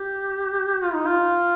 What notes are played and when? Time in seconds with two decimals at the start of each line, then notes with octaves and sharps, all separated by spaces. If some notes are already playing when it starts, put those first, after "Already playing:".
Already playing: G4
0.82 F4
0.94 D#4
1.06 F4